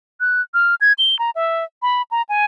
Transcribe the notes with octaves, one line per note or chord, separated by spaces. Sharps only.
F#6
F6
G#6
G7
A#5
E5
B5
A#5
G#5